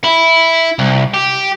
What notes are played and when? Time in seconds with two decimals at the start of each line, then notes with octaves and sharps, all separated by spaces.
0.04 E4
0.79 C2
1.14 G4